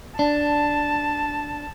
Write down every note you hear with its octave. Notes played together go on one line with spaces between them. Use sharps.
D4 A5